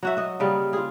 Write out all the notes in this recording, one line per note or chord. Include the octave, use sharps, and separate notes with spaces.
F#3 F#4 E5
F#4 D#5
C#3 G3 A#3
F4 G#4